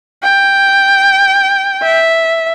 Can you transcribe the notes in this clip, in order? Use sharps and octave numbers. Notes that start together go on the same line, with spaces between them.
G5
E5